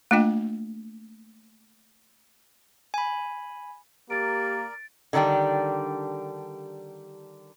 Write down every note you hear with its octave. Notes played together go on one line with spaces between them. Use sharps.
A3 A#3 D4 F4 D#5 G5
G#5 B5
A#3 G4 A#4 D5 A6 D7
D3 D#3 G3 D4 G4